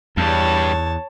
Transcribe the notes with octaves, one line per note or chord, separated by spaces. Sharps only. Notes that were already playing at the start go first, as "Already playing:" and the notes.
E2 G2 G3 C#5 A5